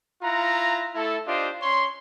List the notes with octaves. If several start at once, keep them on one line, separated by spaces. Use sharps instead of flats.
E4 F4 F#5 A#5
A3 E4 A4
D4 F4 G4 C5 D#5
C#4 C#5 C6